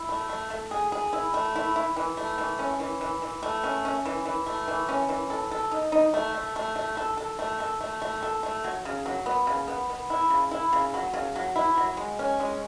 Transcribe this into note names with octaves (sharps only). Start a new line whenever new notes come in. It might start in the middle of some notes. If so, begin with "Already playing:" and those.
Already playing: E4
A3
A3
A3
G#4
G#4
E4
A3
E4
E4
E3
A3
E3
C#4
E3
E3
E3
A3
C#4
C#4
E3
E3
A3
E3
C#4
E3
A4
A4
D#4
D#4
A3
A3
A3
A3
A4
A4
A3
A4
A3
A3
A4
A3
F#3
C#3
F#3
B3
C#3
B3
B3
E4
C#3
E4
C#3
F#3
C#3
F#3
E4
F#3
G#3
C#4
G#3